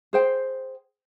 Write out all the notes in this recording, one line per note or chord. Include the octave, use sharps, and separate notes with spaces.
G#4 C5 G5